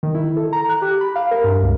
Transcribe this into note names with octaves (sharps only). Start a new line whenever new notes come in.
D#3
E4
A4
A#5
F#6
G4
B5
F5
A#4
G2
C#2